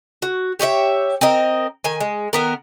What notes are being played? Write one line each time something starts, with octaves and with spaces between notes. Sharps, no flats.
F#4
G4 C#5 D#5 E5
C4 A#4 D#5
D#3 G#5
G#3
D#3 B3 A#4